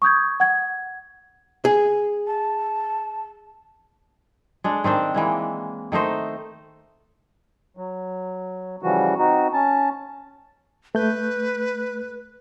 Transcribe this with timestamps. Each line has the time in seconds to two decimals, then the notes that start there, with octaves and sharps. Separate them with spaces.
0.02 C#6 D#6 G6 G#6
0.40 F#5 G#6
1.65 G#4
2.27 A5
4.64 G#3 D4 A4
4.84 D#3 C4 D4 C5
5.14 E3 G#3 A#3
5.92 D#3 A3 D#4 C5
7.77 F#3
8.82 C#3 E3 F3 G3 F#4
9.19 C4 D#4 F#4
9.53 C#4 A5
10.95 A3 B4 G6